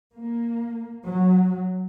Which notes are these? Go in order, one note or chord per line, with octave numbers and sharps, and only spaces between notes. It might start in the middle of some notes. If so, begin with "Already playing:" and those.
A#3
F#3